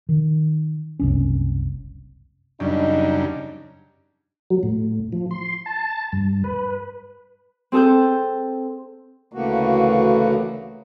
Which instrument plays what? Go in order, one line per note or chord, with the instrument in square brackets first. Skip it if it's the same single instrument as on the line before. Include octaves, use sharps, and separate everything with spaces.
[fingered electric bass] D#3
F#1 C2 C#4
[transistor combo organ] F#2 C#3 G3 [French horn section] D4 D#4
[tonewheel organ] F#3
A2
F3
C6
A5
G2
B4
[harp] C4 G#4 A4 D#6 G6
[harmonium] D2 C#3 E3 A3 A#3 F#4